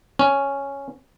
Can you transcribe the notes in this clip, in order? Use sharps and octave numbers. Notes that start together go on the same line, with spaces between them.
C#4